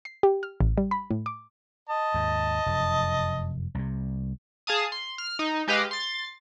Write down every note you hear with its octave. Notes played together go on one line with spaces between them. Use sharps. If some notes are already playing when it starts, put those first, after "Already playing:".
C7
G4
F6
A1
G3
B5
A2
D6
D#5 A5
D#2 G#2
F1 F#2
C2 C3
G#4 F5 A5 D#6
C6
F6
D#4
G#3 G4 B4 D#5 F5
C6 A6